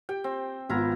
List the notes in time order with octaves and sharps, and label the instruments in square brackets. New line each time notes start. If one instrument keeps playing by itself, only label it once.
[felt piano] G4 [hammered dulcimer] G5
[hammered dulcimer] C4
[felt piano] G#1 B3 [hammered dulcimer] E4 F4 A#5